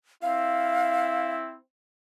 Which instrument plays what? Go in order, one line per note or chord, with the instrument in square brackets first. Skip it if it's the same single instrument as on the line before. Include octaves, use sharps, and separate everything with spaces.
[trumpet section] C4 E4 [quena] F5